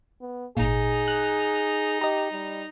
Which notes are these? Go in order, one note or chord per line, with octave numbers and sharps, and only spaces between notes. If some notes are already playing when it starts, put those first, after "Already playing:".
B3
G#1 A#2 D#4 G#4
F#6
G4 D#5 A#5
G3